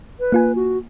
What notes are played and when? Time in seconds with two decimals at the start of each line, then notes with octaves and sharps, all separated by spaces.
0.20 B4
0.32 A#3 F4 G#5
0.55 F#4